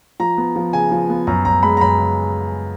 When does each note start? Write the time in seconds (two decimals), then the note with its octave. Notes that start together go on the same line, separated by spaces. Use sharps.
0.20 F3 A#5
0.38 B3
0.56 F3
0.73 C#3 G#5
0.92 F3
1.09 B3
1.27 F#2 A#5
1.45 F#2 A#5
1.63 G#3 B5
1.77 A#5
1.81 F#2 B5
1.99 C#3